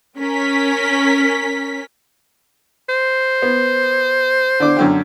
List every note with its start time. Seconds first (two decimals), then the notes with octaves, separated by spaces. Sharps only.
0.19 C#4 A#4 B6
2.89 C5
3.42 B3
4.60 D3 D4 D6
4.77 F#2 D3 G5